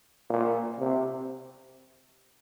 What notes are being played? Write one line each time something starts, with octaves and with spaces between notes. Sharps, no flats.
A#2
C3